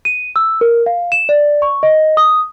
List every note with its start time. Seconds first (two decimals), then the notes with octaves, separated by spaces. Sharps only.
0.05 D#7
0.36 E6
0.61 A#4
0.86 F5
1.12 E7
1.29 D5
1.62 C#6
1.83 D#5
2.17 D#6